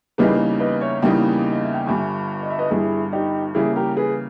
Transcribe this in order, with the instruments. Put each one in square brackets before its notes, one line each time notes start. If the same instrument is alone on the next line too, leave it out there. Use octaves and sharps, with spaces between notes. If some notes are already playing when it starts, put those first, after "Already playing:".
[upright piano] E2 C#3 G3 A#3 D#4 [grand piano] G#4 B4
[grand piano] B4 D#5
C#5 E5
[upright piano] E2 C#3 G3 A#3 D#4 [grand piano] D#5 G5
[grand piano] D#5
E5
G5
[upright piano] G1 G2 G3 [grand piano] E5 G#5
[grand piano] D#5
E5
B4 D#5
[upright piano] G1 G2 G3 [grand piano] E4 G#4
[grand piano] D#4 G4
[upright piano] C#3 E3 G3 A#3 [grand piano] E4 G#4
[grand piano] G4 A#4
G#4 B4